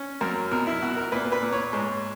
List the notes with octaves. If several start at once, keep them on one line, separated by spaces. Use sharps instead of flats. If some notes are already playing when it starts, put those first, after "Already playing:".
Already playing: C#4
F#2 A#4
B2 A#4
E4
B2 F#4
A#4
A#2 B4
B4
A#2
C#5
G#2